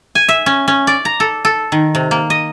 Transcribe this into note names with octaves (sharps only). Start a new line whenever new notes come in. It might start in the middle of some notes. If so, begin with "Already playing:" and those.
G#5
E5
C#4
C#4
D5
A#5
A4
A4
D#3
C3
A#3
D#5